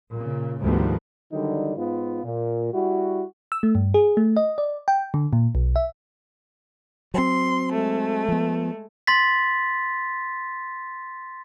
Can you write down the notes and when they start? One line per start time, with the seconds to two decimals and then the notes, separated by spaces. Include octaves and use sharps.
0.13 A#2 C#3
0.61 D2 G#2 D#3 F3 G3 B3
1.33 D3 D#3 F#3 G3 D#4
1.77 G#2 B3 F4
2.24 A#2
2.74 G3 E4 F#4
3.52 E6
3.63 A3
3.75 G2
3.94 G#4
4.17 A3
4.37 D#5
4.58 D5
4.88 G5
5.14 D3
5.33 A#2
5.55 B1
5.76 E5
7.14 F#3 C4 C6
7.72 G#3 A3
8.28 F3 B3
9.07 C6 A6 B6